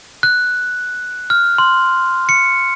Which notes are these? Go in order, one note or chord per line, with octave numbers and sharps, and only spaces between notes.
F#6
F6
C6
C#7